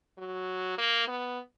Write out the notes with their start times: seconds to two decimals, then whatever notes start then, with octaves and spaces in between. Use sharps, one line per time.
0.18 F#3
0.78 A#3
1.08 B3